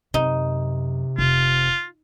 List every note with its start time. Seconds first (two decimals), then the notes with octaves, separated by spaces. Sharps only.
0.14 F#2 C3 D#4
1.18 F1 F4